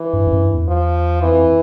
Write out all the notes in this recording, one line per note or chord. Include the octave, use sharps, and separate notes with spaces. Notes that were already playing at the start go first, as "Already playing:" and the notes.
Already playing: E3
G2
F#2
G2
E2
F3
F2 E3